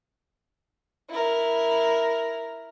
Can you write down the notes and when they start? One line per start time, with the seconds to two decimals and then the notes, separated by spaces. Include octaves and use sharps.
1.10 E4 A#4